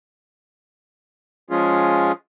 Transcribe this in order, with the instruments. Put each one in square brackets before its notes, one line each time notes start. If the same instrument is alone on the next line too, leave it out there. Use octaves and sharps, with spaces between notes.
[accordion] F3 G#3 C#4 F4 G#4